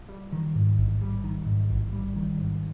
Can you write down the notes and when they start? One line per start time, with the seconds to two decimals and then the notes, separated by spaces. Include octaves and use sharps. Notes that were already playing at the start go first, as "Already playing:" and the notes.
Already playing: F4
0.09 G3
0.33 D#3
0.56 G#2
0.78 A1
1.02 G3
1.24 D#3
1.46 G#2
1.70 A1
1.93 G3
2.16 D#3
2.39 G#2